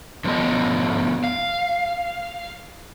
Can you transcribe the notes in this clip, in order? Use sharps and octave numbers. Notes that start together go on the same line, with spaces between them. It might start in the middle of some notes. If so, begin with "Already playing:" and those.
D3 F3 B3 D#5
F5